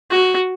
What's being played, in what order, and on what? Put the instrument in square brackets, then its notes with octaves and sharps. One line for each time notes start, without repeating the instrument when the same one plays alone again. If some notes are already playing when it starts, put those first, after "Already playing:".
[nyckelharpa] F#4